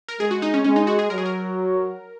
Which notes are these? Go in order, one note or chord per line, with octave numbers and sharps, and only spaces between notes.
A#4
G#3 G#4
F#4
D#4
C#4
G#3 C#4
D#4
F#4
G#4
F#3 A#4
G#4
A#4